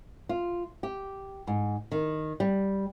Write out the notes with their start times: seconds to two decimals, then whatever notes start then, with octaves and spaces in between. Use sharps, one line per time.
0.29 F4
0.83 G4
1.47 G#2
1.92 D#3
2.40 G3